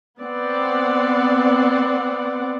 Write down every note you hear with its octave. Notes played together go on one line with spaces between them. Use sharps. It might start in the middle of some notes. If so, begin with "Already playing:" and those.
B3 C4 D5 F#5